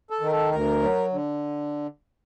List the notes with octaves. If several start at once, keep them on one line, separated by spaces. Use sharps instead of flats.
A4
D#3
A#4
A4
D2 A#4
F#3
D3